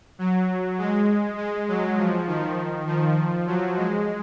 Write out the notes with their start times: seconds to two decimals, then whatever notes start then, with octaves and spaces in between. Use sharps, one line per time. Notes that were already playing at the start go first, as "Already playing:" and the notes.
0.19 F#3
0.78 G#3
1.38 G#3
1.68 F#3
1.98 F3
2.27 D#3
2.86 F3
3.47 F#3
3.76 G#3